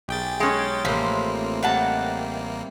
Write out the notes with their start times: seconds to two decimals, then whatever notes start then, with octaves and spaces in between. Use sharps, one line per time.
0.08 B1 G4 G#4 A#4 G5 A6
0.40 G#3 C#4
0.85 A1 C3 F3 A3 A#3 C5 B5
1.63 C3 D#3 G3 F#5 A5